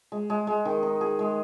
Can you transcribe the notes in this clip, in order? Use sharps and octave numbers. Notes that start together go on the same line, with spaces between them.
G#3
G#3
G#3
D#3
D#4
G#4
G#3